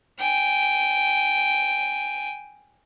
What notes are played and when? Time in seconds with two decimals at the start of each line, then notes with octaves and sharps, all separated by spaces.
0.19 G5 G#5